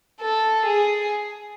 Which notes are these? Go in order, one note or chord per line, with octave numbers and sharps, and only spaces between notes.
A4
G#4